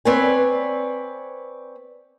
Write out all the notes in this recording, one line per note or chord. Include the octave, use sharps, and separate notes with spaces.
C4 B4 C#5 D5 G#5